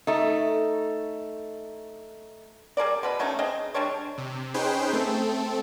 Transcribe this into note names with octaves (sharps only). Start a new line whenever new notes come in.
A3 D#4
G3 G#4 A#4 D5
B2 B4 B5
F#3 A3 C#4 D#4
C4 G#4 D#5
G3 G#3 D4 C#5
C3
C#4 D#4 G#4 B4 C5 G5
A3 C4 A4